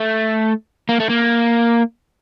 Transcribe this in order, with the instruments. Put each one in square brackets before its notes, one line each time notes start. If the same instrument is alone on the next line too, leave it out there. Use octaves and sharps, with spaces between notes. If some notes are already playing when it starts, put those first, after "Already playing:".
Already playing: [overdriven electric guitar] A3
A#3
A3
A#3